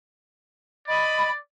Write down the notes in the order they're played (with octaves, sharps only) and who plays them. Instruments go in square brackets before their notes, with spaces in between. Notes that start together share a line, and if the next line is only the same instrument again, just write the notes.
[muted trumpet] D5 [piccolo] D#5 [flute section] B5